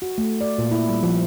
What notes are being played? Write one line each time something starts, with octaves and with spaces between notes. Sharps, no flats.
F#4
A3
D5
A#2
E4
G3
F3